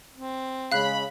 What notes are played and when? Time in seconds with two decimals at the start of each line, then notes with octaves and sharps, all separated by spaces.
0.14 C4
0.72 C#3 G#3 F5 B5 F#6